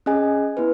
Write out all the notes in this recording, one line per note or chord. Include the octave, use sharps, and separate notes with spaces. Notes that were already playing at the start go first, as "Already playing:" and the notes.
C#4 G#4 D#5 G#5
B3 E4 B4